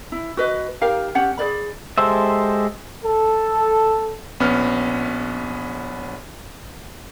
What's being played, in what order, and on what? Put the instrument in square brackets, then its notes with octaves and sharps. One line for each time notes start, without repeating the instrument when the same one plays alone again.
[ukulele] E4
F#4 B4 D#5
D#4 G4 A#4 F5
C#4 G4 F#5
G#4 C5 D5 B5
[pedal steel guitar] G#3 G4 A4 C5 E5
[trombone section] A4
[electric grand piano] A#1 B3 C#4 F6